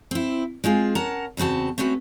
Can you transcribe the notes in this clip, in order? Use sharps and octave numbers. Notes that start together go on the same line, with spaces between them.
C4 E4
G#3 C4 F4 G#4
C#4 A#4 F#5 A5
E2 C#3 C4 F#4 A5
A3 C4 C#4 F#4 B4